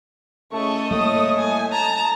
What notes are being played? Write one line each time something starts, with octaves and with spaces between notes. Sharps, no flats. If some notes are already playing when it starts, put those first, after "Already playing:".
C#3 A3 E4 A4 D#5 C#6
A2 G3 A#3 E5 D#6
G#5
A5 A#5